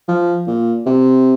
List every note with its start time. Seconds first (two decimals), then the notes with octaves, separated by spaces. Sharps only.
0.08 F3
0.47 A#2
0.86 C3